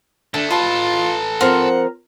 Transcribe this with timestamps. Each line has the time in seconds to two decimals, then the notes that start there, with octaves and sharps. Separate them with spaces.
0.34 D3 A3 D4
0.50 F4 A4 B4 D#5 A5
1.41 F3 C4 A#4 C5 F#5 C6